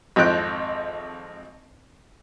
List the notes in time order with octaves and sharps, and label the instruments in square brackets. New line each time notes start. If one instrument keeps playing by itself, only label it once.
[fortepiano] G#1 F2 F3 G5 F#6